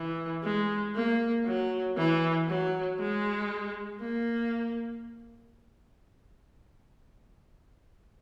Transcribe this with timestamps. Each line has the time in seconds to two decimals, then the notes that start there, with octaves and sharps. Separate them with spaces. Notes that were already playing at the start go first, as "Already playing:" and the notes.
Already playing: E3
0.43 G#3
0.95 A#3
1.46 F#3
1.97 E3
2.48 F#3
2.99 G#3
4.01 A#3